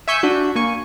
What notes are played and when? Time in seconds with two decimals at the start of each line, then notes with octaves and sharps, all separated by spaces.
0.08 E5 G#5 C#6 E6 G6
0.23 D4 F#4
0.56 A#3 G#5 C#6